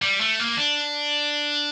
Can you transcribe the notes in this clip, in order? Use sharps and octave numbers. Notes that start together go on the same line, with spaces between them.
G3
A3
A#3
D4